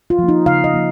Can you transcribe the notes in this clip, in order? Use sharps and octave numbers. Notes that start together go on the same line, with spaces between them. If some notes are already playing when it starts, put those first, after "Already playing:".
F4
F3 A#3
D#4
C#3 F5
D#5
F3 A#3